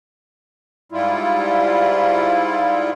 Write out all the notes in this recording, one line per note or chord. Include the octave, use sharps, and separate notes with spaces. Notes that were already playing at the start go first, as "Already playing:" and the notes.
G#2 G3 E4 F4